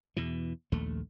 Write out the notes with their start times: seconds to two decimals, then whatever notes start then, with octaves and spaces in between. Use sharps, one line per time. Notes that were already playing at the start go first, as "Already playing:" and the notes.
0.17 E2 B2 E3
0.72 A#1 D#2 A3